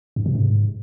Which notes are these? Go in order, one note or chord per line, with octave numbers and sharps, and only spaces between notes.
G2
C3
G#2